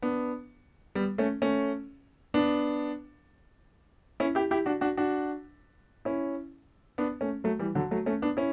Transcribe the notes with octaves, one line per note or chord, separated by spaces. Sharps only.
B3 D4
G3 B3
A3 C#4
A3 C#4
B3 D4
C#4 E4
E4 G4
E4 G4
D4 F#4
D4 F#4
D4 F#4
C#4 E4
B3 D4
A3 C#4
F#3 A3
E3 G3
D3 F#3
F#3 A3
A3 C#4
B3 D4
C#4 E4